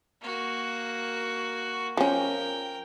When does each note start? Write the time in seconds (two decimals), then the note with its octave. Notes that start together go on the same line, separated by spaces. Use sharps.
0.21 A#3 F#4
1.97 F3 C#4 A#4 G5